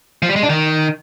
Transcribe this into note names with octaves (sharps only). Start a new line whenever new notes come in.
F3
G3
G#3
D4
D#3